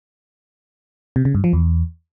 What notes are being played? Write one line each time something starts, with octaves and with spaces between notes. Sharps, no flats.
C3
C#3
G2
F3
E2